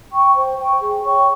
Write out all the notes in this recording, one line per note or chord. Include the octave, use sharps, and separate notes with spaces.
G5 C#6
C5
G5 C#6
G#4
C#5 G5 C#6